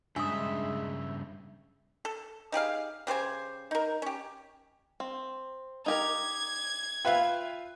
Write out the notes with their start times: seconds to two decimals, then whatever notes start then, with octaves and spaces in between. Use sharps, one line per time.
0.16 G2 C#3 G#3 D4 E5 D#6
2.05 A4
2.52 D#4 G4 G#4 F5
3.07 C#3 G4 C5 G#5
3.71 D#4 A#4
4.02 C#4 G4
5.00 C4
5.86 D#4 G4 A#4 G#6
7.05 F4 B4 E5 F5 G5